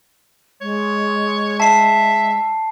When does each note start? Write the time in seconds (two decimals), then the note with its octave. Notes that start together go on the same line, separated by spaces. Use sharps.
0.61 G#3 C#5
1.60 E5 A5 C7